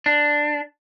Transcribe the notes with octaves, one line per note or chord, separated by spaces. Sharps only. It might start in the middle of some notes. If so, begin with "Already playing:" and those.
D4